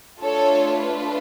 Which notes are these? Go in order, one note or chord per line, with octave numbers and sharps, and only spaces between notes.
A3 D4 F4 A4 C#5
B4